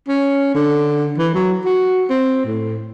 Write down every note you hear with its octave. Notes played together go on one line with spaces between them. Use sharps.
C#4
D3
E3
F#3
F#4
C4
A2